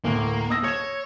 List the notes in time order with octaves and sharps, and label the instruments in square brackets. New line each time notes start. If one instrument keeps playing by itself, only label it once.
[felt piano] D2 A2 [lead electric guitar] A#3
[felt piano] D#6 E6 A#6
[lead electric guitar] C#5 [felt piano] G#6 E7